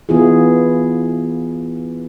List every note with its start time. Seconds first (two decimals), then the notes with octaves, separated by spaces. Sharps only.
0.09 E3 B3 E4 F4 G#4